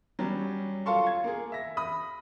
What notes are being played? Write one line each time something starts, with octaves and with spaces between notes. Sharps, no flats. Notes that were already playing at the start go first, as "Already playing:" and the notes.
F#3 G3 C#4
F4 A4 F5 A5 C6 C#6
G#6
A#3 G#4
E5 A#6
B5 D#6